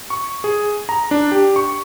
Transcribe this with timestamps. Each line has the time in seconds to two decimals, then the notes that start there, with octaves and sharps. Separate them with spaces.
0.10 C#6
0.44 G#4
0.89 A#5
1.11 D4
1.32 G4
1.56 C#6